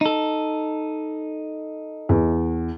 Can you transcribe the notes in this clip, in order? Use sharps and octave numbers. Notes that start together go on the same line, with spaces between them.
D#4 A4
E2